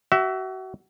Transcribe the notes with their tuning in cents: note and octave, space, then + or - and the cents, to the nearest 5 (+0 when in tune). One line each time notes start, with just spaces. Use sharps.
F#4 +30 E5 +0